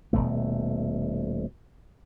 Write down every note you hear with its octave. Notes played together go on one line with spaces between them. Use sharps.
D#1 E2 B2 A3